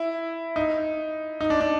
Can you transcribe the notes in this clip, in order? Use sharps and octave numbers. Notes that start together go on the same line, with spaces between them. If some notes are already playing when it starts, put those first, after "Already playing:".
Already playing: E4
D#4
D#4
D4
D4